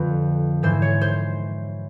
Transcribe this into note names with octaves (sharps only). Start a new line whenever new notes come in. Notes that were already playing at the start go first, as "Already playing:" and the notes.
Already playing: F2 D3 F3 B4
G#2 E3 C5
C#5
C5